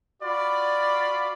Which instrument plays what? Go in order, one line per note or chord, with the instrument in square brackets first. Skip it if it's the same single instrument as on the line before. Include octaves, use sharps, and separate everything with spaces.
[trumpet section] F4 F#4 D5 B5